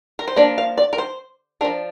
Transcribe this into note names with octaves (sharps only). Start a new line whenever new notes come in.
A#4
C5
F3 A#3 D4 D5
F5
D5
A#4
C5
F3 A#3 D4 A#4